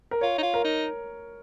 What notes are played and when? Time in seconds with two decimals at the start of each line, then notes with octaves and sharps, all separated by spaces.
0.11 A#4
0.21 F4 C#5
0.38 D#4
0.43 F4
0.54 A#4
0.64 D#4